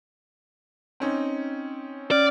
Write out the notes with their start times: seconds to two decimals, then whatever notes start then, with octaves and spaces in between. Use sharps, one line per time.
1.00 C4 C#4 D#4
2.11 C#4 D5 F6